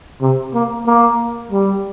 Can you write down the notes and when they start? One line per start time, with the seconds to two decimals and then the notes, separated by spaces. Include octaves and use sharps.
0.21 C3
0.54 A#3
0.86 A#3
1.51 G3